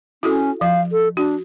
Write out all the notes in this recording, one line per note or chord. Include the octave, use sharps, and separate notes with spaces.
C#4 E4 F#4 A4
F3 F5
A4
D4 F#4